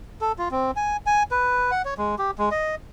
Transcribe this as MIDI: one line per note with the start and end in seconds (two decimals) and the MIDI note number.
0.21 0.32 69
0.39 0.48 65
0.51 0.71 60
0.76 0.97 80
1.06 1.23 80
1.31 1.71 71
1.71 1.82 78
1.85 1.94 73
1.98 2.15 56
2.19 2.31 67
2.38 2.49 56
2.51 2.75 75